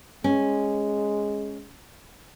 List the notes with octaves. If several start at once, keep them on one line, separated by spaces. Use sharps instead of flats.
G#3 C#4